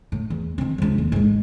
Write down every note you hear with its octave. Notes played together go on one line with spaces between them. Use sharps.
A2
E2
D#3 C4
C#2 F3
D#1
A1 G#2